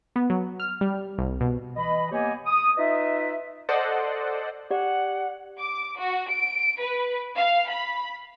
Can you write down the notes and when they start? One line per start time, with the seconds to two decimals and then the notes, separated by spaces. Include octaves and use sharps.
0.16 B3
0.30 F#3
0.60 F6
0.81 G3
1.18 C2
1.41 B2
1.76 E3 D#5 B5
2.12 A#3 B3 G4 C#5 D#5 G#5
2.46 D#6
2.77 D#4 F4 B4 D#5 E5
3.69 A4 C5 D5 D#5 F#5
4.71 G4 D5 F#5
5.59 D6
5.99 F#4
6.31 D7
6.80 B4
7.36 F5
7.69 B5